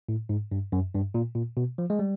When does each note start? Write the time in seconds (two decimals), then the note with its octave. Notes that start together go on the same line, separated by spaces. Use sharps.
0.09 A2
0.29 G#2
0.52 G2
0.72 F#2
0.94 G2
1.14 A#2
1.35 A#2
1.57 B2
1.78 F3
1.90 G#3
1.99 G3